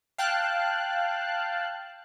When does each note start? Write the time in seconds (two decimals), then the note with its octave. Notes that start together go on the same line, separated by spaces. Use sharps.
0.18 F5 G5 A5 F#6